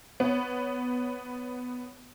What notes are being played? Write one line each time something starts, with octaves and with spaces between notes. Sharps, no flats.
B3 C#5